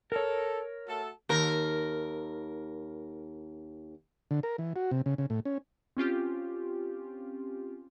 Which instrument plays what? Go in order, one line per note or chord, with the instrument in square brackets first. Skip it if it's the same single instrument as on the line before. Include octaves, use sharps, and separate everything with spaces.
[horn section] A4 [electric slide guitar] A#4 C#5
[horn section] A3 F#4 A4
[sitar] D#2 A#4
[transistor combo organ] D3
A#4
E3
F#4
C3
C#3
C#3
A2
C#4
[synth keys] C4 C#4 F4 G4